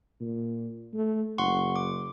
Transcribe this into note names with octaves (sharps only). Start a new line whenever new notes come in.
A#2
A3
F#1 F#5 C6 C#6
D6